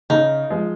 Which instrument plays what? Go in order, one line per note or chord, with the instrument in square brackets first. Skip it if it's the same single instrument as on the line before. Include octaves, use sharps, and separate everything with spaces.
[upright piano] C#3 [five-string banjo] D#4
[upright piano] F3 G#3